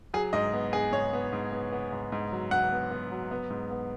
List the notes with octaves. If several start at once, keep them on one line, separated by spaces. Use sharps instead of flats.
F#3 G#4
G#2 D#5
B3
B3 G#4
G#2 C#5
B3
G#2
B3
B3
G#2
G#2
F#3
F#3 F#5
B3
B3
F#3
B3
G#2
B3